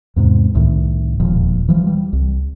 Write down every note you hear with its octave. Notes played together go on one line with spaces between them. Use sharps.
E2 G#2 C3
C2 A2 D#3
E1 D#2 A#2 F3
E3 F3 G3
G3
C2